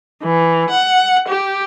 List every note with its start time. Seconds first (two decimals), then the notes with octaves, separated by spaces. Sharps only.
0.23 E3
0.70 F#5
1.29 G4